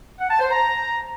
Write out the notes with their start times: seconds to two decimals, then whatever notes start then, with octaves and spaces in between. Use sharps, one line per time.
0.18 F#5
0.29 A5
0.40 C5
0.50 A#5